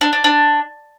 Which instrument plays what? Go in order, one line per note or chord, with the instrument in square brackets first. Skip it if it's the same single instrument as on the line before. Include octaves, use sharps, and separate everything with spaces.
[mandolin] D4
D4
D4